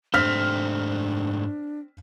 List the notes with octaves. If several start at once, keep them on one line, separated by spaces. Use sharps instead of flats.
G#2 A3 C4 D4 G4 F6 B6